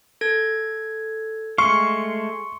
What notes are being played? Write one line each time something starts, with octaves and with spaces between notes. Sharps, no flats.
A4 G#6
G#3 A3 F5 C6 C#6 C#7